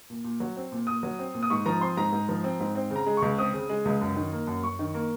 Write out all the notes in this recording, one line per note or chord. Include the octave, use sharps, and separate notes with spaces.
A#2
A#2
F#3
C4
A#2
A#2 D#6
F#3
C4
A#2
D#6
G#2 C#6
F3 A#5
C4 C6
G#2 A#5
G#2
F3
C4
G#2
C4
C#3
A#5
G#3
C#2 C#6
C4 D#6
C#3
G#3
C#2
F#2
D#3
A#3
F#2
F#2 C#6
D#3
A#3